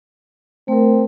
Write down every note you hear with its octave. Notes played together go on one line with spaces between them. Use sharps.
A3 C4 A#4